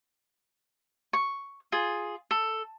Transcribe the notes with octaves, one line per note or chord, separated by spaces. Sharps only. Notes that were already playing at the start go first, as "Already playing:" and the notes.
C#6
F4 G#4
A4